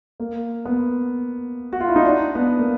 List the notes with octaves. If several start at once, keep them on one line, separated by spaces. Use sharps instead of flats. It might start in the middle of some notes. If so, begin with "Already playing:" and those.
A#3
B3
F#4
F4
E4
D#4
D4
B3
A#3